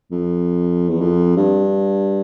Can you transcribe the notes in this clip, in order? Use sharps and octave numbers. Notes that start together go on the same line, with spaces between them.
F2
E2
F2
G2